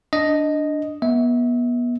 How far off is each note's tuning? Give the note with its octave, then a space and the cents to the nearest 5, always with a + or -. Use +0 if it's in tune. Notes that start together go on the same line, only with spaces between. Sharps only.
D4 +0 D#5 +0
B3 -30 E5 -30